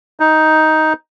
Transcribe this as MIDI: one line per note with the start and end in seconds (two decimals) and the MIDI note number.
0.20 0.93 63